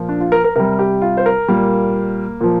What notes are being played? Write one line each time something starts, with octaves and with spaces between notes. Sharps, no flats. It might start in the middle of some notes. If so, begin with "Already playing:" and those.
Already playing: A#2 F3
D4
F4
A#4
A#4
C3 G3 A#4
G4
F4
C5
A#4
A#2 G3 A#3
A#2 F3